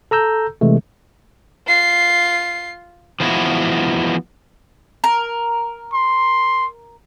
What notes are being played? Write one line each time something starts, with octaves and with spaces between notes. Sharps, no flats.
A4 A#5 E6 G6
C3 E3 G#3 A3
F4 C7
E3 F3 G#3 B3 E4 F#4
A#4
C6